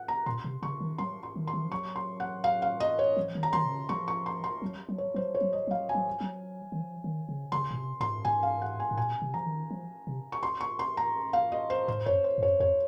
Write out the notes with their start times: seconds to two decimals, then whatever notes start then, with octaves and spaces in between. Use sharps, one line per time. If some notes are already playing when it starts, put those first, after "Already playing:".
Already playing: F#5
0.08 A#5
0.26 A#2 C6
0.44 C3
0.62 C#3 C#6
0.81 D#3
0.98 F#3 C6
1.23 C6
1.36 D#3
1.47 C6
1.54 D#3
1.65 F3
1.72 F#3 C#6
1.96 C6
2.20 F#5
2.44 F5
2.62 F5
2.80 D#5
2.99 C#5
3.17 F3
3.35 D#3
3.43 A#5
3.53 D#3 C6
3.64 C3
3.71 C#3
3.89 F3 C#6
4.08 C#6
4.26 C6
4.44 C6
4.62 F#3
4.89 F#3
4.98 C#5
5.14 F#3 C5
5.35 C#5
5.41 F#3
5.53 D#5
5.67 F#3 F5
5.89 G#5
5.95 F#3
6.21 F#3
6.72 D#3
6.80 F3
7.04 D#3
7.29 C#3
7.52 C#3 C6
7.71 A#2
7.76 C3
8.00 G#2 C6
8.25 G#2 G#5
8.43 F5
8.62 F#5
8.80 G#5
8.91 G#2
8.97 A#2 G#5
9.22 C3
9.34 F3 A#5
9.46 D#3
9.71 F3
10.07 C3
10.32 C#6
10.43 C6
10.61 C#6
10.79 C6
10.97 A#5
11.33 F5
11.52 D#5
11.70 C5
11.88 G#2 C5
12.06 F#2 C#5
12.24 C5
12.38 G#2
12.42 F#2 C#5
12.60 F2 C#5